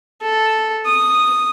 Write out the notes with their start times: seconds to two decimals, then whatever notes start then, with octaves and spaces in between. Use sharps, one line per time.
0.22 A4
0.86 D#6